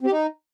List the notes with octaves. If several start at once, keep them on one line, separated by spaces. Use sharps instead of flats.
C4
G4
D#4